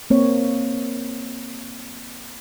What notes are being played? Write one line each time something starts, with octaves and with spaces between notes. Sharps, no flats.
A#3 C4 C#5